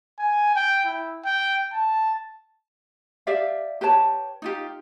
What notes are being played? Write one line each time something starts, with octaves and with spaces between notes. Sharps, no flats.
G#5
G5
E4
G5
A5
G4 D5 E5 F5
G4 B4 C#5 A5
D#4 F4 G4